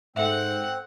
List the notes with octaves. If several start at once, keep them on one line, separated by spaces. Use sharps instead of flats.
G#2 C4 A4 E5 F#5